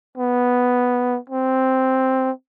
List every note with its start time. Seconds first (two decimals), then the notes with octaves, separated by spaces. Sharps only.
0.18 B3
1.30 C4